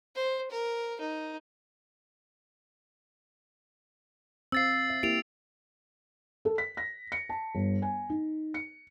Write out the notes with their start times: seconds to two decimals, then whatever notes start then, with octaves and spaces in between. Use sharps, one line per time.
0.15 C5
0.51 A#4
1.00 D#4
4.52 C4 F5 E6 A6 C7
4.90 E5
5.03 A#3 E4 G4 D7 F7
6.45 A4
6.58 B6
6.77 A#6
7.12 C#7
7.29 A5
7.55 G1
7.82 G#5
8.10 D#4
8.54 C#7